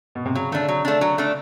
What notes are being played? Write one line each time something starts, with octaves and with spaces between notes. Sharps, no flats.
B2
C3
C#3 F#3
D3 A3 D4
F#3
A3 D4
F#3
A3 D4